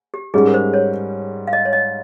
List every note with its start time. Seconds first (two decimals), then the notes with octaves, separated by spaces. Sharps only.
0.14 G4
0.34 G#2 G3 C#4 G#4
0.47 A#4
0.54 C5
0.73 C#5
1.47 F5
1.53 D#5
1.65 C#5
1.73 D#5